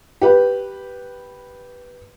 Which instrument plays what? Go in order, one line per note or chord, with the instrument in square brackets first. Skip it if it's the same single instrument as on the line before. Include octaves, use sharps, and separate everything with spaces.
[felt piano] G4 B4